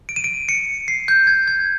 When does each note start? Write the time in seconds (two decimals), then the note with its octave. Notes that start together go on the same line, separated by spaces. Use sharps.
0.09 D7
0.16 D#7
0.24 D7
0.49 C#7
0.88 C7
1.08 G6
1.27 G#6
1.48 G#6